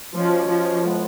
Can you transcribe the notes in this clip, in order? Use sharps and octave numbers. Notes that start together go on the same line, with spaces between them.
F3 G#3 C#4 F#4 C#5
F3
A2 F3 G#3 B3